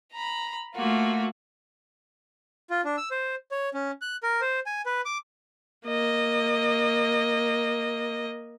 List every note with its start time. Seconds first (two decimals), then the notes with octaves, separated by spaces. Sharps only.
0.13 A#5 B5
0.76 A3 A#3 F4 F#4
2.70 F4
2.85 D4
2.97 E6
3.11 C5
3.51 C#5
3.74 C#4
4.01 F#6
4.23 A#4
4.41 C5
4.66 G#5
4.86 B4
5.05 D6
5.86 A#3 D#5